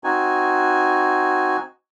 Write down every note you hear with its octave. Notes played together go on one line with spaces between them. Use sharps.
C4 D#4 F#4 G#5